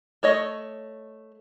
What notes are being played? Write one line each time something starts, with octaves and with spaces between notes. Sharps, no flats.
A3 C#5 D#5